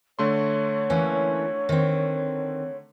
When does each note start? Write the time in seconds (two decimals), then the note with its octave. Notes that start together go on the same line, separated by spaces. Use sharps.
0.19 D3 A3 C#5 C6
0.90 E3 A#3 C#4
1.69 D#3 C4